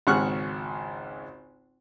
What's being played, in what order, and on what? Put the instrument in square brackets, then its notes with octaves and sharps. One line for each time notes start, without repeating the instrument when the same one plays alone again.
[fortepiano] G#1 C#2 F#5 C#6 F6 F#6